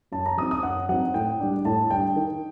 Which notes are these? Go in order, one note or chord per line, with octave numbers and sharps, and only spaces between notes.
F#2 A5
A#5
F#3 C4 D#4 D#6
D#6
F#2 F#5
F#3 C4 D#4 F#5
A2 G5
G3 D4
A2 A5
G3 D4 G5
D#3